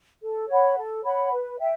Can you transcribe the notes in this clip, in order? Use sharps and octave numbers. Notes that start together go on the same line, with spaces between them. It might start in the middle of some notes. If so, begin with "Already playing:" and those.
A4
C#5 F#5 B5
A4
C#5 F#5 B5
B4
E5 G5